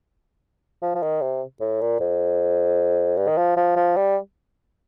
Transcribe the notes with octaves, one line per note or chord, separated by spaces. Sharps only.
F3
F3
D#3
C3
A2
A#2
F2
G2
D#3
F3
F3
F3
G3